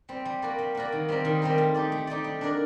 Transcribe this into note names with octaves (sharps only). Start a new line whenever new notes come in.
G3 C4
G3
A#3 F#4 A#4 D5
G3
A#3 F#4 A#4 D5
D#3
G3 C4 G4 A#4
D#3
G3 C4 G4 A#4
A3
D#4 G4 D5
A3
D#4 G4 D5
G3
D4 F#4 A#4 D5